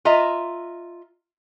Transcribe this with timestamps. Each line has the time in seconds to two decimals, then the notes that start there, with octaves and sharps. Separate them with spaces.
0.05 F4 D#5 E5 A#5